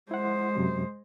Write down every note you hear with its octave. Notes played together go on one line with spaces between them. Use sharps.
G#3 E4 C5 F#5
F#2 C3 F#3